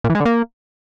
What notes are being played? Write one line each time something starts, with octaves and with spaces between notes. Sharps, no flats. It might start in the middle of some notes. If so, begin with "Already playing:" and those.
A#2
E3
G#3
D3
A#3